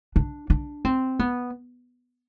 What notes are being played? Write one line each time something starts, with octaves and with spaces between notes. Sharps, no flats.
D4
D4
C4
B3